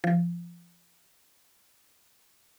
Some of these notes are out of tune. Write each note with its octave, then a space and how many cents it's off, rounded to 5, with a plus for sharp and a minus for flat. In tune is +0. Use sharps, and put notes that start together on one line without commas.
F3 -20